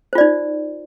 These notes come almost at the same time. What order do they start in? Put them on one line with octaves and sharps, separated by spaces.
C5 F4 D5 D#4